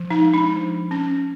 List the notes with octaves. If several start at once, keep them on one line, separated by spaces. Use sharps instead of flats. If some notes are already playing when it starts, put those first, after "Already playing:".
Already playing: F3
D#4
G#3
D4
F3
C#4